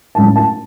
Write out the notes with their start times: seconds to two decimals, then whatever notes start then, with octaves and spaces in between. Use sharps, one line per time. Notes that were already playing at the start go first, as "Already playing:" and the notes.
0.15 A2 F#3 A3 C#4 A5
0.36 A5